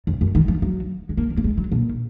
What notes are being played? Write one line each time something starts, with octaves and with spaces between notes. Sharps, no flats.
F2
F#2
D#3
F3
F#3
G#3
A#3
F#3
A#3
G#3
F#3
A#2